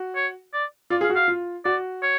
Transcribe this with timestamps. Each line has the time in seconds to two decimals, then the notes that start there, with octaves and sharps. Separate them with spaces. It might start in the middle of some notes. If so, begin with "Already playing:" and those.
Already playing: F#4
0.16 C#5
0.53 D5
0.90 F4 D5
1.01 G#4 F5
1.10 F#4
1.15 F5
1.28 F4
1.65 F#4 D5
2.03 C#5